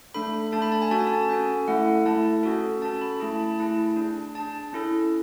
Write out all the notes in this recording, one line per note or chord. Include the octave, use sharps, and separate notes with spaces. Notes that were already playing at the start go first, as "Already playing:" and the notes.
A3 D4 A4 B5
A3 D4 A4 A5
B5
A5
G#5
C#4 F#4 A4 A5
G#5
A5
C#4 F#4 A4 G#5
A3 E4 A4 F#5
A3 E4 A4 A5
C#4 F#4 A4
C#4 F#4 A4 A5
B5
A3 E4 G#4 A5
A5
B5
A3 E4 G#4 A5
D4 G#4
D4 G#4 A5
C#4 E4 A4